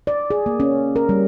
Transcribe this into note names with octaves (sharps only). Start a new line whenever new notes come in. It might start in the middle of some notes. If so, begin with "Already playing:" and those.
D5
G#4
A#3
C#4
A#4
G3